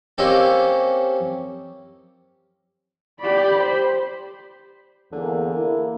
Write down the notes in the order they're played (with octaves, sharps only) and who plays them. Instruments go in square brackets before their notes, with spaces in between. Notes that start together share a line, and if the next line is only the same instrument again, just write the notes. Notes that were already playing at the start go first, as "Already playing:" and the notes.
[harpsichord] A#3 C4 C#4 D#4 G4 A4
[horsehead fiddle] G4 B5 [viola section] D5
[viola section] C5
[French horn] E2 [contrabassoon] D3 [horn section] A#3
[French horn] E4